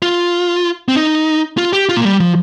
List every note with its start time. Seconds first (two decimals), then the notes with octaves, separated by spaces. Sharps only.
0.02 F4
0.88 C4
0.96 D#4
1.58 F4
1.73 G4
1.89 F4
1.97 A#3
2.05 G3
2.20 F3